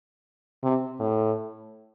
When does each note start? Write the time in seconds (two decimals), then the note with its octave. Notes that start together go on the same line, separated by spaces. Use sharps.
0.64 C3
1.00 A2